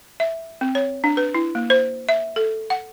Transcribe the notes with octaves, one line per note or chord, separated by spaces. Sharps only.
E5
C4
C#5
D4
B4
E4
A#3
C5
E5
A4
F#5